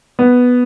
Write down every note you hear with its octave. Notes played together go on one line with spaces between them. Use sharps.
B3